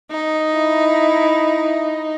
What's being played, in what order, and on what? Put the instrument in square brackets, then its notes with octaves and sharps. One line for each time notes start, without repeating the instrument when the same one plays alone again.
[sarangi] D#4
[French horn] E4